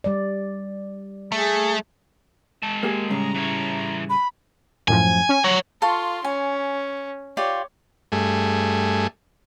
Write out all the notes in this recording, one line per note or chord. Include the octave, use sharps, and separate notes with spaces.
G3 D5
A3 G#4
G#3 A5
A#3 G4 G#4
A2 C#3 G3 A#5
E3 C#5
B5
F#2 A2 F3 G#5
C#4
F#3 C#6
F4 A4 F5 C6 C#6
C#4 G#5
F4 G4 C#5 D5
G2 A3 G#4